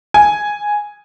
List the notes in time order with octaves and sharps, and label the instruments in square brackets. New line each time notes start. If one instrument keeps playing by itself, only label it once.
[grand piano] G#5